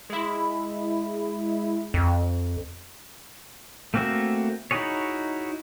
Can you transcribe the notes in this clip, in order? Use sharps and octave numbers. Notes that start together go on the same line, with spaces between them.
G#3 E4
F2
A3 A#3 C4 F#4 E5
D#4 E4 F#4 G#4 C#5